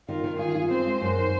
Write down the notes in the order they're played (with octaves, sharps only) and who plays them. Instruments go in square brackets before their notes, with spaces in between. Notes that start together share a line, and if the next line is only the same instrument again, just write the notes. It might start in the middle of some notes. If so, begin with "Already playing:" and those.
[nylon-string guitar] D#3 [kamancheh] F4
[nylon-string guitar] D#3
[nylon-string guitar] F4 [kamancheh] G#4
[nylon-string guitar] F4
[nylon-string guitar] C4 [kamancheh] C5
[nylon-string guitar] G#3
F#2
D#3